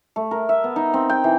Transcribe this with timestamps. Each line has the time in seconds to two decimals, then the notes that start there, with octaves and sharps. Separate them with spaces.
0.16 A3
0.31 A#4
0.49 E5
0.64 B3
0.76 D#4
0.94 C4
1.09 G5
1.24 E3